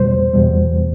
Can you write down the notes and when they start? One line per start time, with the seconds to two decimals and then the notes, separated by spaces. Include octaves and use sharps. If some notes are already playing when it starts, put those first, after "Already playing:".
Already playing: E2 B2 G3 C5
0.33 E2 B2 G3